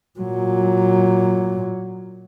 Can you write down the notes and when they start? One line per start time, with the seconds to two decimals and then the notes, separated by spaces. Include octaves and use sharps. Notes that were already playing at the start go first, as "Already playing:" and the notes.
0.19 A#2 F#3